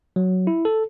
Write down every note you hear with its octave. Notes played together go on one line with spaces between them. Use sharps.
F#3
E4
A4